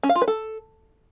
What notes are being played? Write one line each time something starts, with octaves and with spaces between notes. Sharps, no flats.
C#4
F5
F4
B4
A4